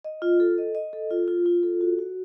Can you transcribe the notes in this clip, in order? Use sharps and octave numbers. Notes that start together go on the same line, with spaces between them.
D#5
F4
A4
D#5
D#5
A4
F4
F4
F4
A4
F#4
F#4